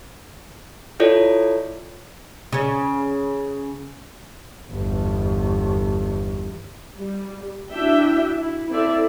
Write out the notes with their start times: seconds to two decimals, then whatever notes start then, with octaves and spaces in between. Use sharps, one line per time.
1.00 E4 F4 A4 C#5 D5
2.53 C#3 C#4
4.72 G1 E2
6.98 G3
7.72 D4 E4 F#4 E5 G5
8.38 E4
8.69 C4 E4 A4 D5 E5